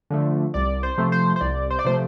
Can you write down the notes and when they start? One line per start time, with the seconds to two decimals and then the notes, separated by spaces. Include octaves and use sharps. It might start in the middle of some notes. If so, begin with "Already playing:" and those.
0.10 D3 F3 A3
0.54 C2 D5
0.83 C5
0.98 C3 F3 A3
1.12 C5
1.36 C5
1.41 C2 D5
1.71 C5
1.79 D5
1.85 C3 F3 A3 C5